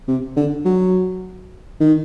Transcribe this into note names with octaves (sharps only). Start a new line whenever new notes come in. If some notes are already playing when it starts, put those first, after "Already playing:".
C3
D3
F#3
D#3